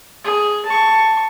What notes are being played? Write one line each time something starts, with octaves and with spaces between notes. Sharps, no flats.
G#4
A5 C#6